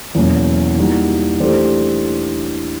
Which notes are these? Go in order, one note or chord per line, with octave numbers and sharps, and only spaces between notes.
E2 B2 F#3 A#3 C#4
E3 G3 A#3 D#4 F#4
E3 A3 D4 G4 C5